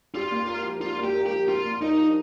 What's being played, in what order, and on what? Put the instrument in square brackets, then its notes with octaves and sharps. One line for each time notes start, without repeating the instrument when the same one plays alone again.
[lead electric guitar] F4 [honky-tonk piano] G4
[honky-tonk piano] A#3
A#4
F3
[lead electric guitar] F4 [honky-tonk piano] G4
[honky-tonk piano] A#3
[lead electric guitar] G4
[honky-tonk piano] A#4
[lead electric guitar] G4
[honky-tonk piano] F3
[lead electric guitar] F4 [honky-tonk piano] G4
[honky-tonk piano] A#3
[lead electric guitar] D#4 [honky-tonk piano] A#4
[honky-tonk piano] F3